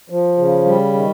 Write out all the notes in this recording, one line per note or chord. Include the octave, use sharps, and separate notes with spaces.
F3
C#3
G3
D#3